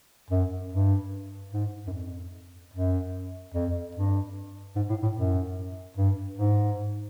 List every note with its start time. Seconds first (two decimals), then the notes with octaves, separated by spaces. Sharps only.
0.30 F#2
0.71 G2
1.52 G#2
1.87 F#2
1.92 F2
2.74 F#2
3.54 F2
3.95 G2
4.76 G#2
4.89 A2
5.03 A2
5.16 F#2
5.97 G2
6.37 G#2